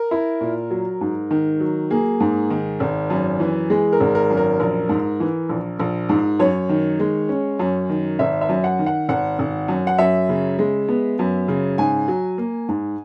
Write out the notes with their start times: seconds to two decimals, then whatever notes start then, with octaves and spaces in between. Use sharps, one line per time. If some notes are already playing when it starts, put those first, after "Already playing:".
Already playing: A#4
0.11 E4
0.41 A#2
0.71 F#3
1.01 G#2
1.31 D#3
1.60 F#3
1.91 A#3 G#4
2.20 G#2
2.50 D#3
2.80 G#1
3.10 F#2
3.40 E3
3.70 G#3 G#4
3.93 A#4
4.00 G#1
4.15 A#4
4.30 F#2
4.37 A#4
4.60 A#1 A#4
4.89 G#2
5.20 E3
5.49 A#1
5.79 A#1
6.09 G#2
6.39 F#2 C#5
6.69 D#3
7.00 G#3
7.29 C#4
7.59 F#2
7.89 D#3
8.19 G#1 E5
8.41 E5
8.49 F#2
8.64 F#5
8.79 D#3
8.86 F#5
9.09 G#1 F#5
9.39 G#1
9.68 F#2
9.87 F#5
9.98 F#2 E5
10.29 C#3
10.59 G#3
10.89 B3
11.19 F#2
11.48 C#3
11.78 G#2 G#5
12.08 F#3
12.38 A#3
12.69 G#2